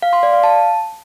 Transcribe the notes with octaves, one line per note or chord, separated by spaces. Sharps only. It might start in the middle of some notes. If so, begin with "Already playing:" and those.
F5
C6
D5
F5
A5